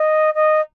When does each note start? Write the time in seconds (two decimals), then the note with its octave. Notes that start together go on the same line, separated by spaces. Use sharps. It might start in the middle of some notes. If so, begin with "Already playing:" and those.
Already playing: D#5
0.34 D#5